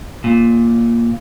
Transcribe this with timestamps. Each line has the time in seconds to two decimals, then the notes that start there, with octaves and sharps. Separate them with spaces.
0.24 A#2